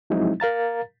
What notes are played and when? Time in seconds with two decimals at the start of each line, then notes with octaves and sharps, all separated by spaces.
0.10 F3 F#3 G#3 C4 D#4 E4
0.40 A#4 F5 A#5 A6